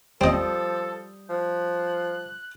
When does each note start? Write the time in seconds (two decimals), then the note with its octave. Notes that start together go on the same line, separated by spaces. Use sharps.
0.21 F3 G3 C4 A4 D#5 D#6 G6
1.30 F3 F#6